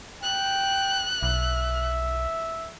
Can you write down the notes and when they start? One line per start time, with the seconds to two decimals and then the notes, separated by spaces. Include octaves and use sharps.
0.23 G5 F#6
1.23 B1 E5